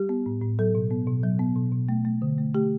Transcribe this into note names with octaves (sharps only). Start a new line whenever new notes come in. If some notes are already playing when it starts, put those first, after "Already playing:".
Already playing: G3 G4
B3
A2
A2
F#3 A4
B2
B3
B2
F#3
B3
B2
B2
A3
A3
D3
A3
A3 G4